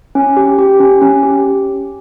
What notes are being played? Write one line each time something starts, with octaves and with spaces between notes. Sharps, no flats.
C#4
G4
G4
C#4
C#4
G4